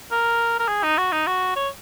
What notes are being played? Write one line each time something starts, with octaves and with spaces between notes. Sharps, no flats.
A#4
A#4
G#4
D#4
F#4
D#4
F#4
C#5